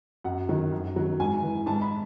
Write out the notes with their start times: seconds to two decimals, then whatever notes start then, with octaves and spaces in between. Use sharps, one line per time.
0.24 F#2 F#5
0.49 D#3 F#3
0.72 F#2
0.96 D#3 F#3
1.20 G#2 G#5
1.43 E3
1.66 G#2 A5
1.82 B5